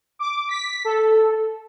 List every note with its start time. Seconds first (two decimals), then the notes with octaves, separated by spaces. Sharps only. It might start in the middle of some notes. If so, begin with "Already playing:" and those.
0.19 D6
0.49 B6
0.84 A4